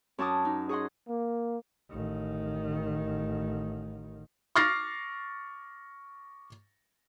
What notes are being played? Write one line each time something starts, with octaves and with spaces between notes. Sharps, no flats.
F#2 C#5 A5 D6 D#6
D#4
G#4 C#5 D#5 F#5 C6
A#3
A1 D#3
C#6 D6 F6 A6 A#6 C7